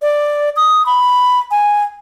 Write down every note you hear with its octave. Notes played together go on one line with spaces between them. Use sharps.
D5
D#6
B5
G#5